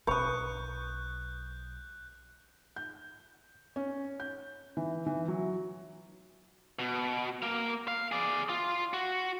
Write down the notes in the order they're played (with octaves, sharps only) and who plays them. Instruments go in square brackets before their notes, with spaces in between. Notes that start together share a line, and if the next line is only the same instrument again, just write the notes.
[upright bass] B1 D4 [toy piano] B4 B5 [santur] C#6 D#6 [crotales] F#6 G6
[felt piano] G6
C#4
G6
E3
E3
F#3
[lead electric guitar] B2
A#3 F5
F5
G#4 D5
F4
F#4